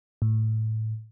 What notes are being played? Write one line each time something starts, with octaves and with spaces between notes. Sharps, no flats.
A2